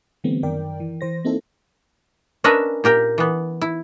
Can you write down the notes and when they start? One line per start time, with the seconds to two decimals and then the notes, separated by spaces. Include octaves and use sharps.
0.24 D3 E3 G3 A3 B3 C4
0.43 F#2 D#3 A#4 D5 G5
0.80 E3
1.01 E3 C5 A#6
1.25 A#3 C4 D#4 E4 A4
2.44 C#4 D4 A#4 B4 D#5 E5
2.84 A#2 G4 A#4 G5
3.18 E3 B3
3.62 E4